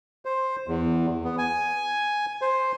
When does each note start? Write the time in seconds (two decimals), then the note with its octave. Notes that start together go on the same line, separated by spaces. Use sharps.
0.25 C5
0.67 E2
1.24 B3
1.38 G#5
2.41 C5